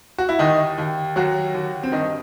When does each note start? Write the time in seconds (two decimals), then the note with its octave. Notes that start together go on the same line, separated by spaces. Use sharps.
0.18 F#4
0.29 E4
0.39 D#2 D#3 D#4
0.78 D#2
1.16 D#2 F#3 F#4
1.55 D#2
1.83 C4
1.92 G2 D#3 D#4